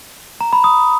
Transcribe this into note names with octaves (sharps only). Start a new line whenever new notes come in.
A#5
B5
D#6